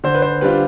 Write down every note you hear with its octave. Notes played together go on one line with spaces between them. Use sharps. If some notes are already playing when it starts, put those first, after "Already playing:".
D3 C5
B4
C5
G3 D4 F4 B4